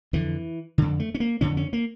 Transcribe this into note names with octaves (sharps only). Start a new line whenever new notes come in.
F2 D3 E3
F2 D3
A3
C#4
A#3
F2 D3 C#4
C#4
A#3